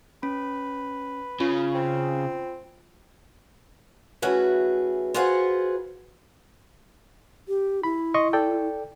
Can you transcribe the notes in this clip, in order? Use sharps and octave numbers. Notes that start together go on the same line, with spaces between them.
C#4 B4
C#3 F4
C4
E3 A3 C#4 F#4 G#4 B4
F4 F#4 G#4 B4 C5 F#5
G4
E4 B5
D#5 C6 C#6
A4 D5 G5